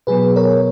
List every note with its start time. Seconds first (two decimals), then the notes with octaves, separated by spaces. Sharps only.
0.07 B2 F#3 B3 G#4 B4
0.36 A#4 C#5